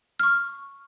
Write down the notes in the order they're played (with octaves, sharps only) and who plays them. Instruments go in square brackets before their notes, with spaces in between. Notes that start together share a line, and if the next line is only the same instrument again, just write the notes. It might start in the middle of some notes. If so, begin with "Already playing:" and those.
[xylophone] C#6 F6